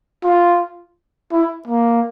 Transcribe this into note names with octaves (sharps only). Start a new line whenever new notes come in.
F4
E4
A#3